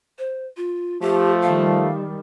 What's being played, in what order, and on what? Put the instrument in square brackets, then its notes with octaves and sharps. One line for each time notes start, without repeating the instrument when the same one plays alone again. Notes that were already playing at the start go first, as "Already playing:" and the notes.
[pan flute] C5
F4
[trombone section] F3 A3 [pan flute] G4
[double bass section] D#3 G3 [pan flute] F5